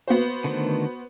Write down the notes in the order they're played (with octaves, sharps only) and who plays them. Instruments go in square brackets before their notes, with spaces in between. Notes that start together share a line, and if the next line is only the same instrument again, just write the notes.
[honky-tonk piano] B3 F#4 C5
[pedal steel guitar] D3 D#3 A3